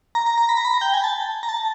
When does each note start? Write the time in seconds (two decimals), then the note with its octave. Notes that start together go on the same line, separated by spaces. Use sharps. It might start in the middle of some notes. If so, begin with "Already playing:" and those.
0.15 A#5
0.26 A#5
0.38 A#5
0.49 B5
0.57 A#5
0.65 B5
0.74 A#5
0.81 G5
0.94 G#5
1.04 A5
1.43 A#5
1.49 A5